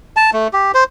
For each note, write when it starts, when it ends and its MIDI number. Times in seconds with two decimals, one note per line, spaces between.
0.16 0.30 81
0.33 0.48 57
0.53 0.72 67
0.74 0.84 72